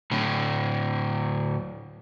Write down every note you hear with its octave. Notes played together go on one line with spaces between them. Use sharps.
A2 D3